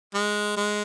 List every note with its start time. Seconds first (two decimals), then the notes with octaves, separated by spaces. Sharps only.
0.14 G#3
0.57 G#3